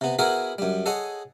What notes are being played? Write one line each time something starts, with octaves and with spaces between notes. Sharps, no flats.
C3 B3
B3 E4 F#4 G#4 A#4
F#2 G3
G#4 A4 C#5 D#5 F#5